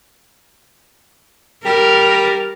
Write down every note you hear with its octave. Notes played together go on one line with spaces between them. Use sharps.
G3 A#4